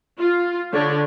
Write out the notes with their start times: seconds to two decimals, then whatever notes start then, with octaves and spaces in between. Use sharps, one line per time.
0.19 F4
0.73 D3 C#5 D5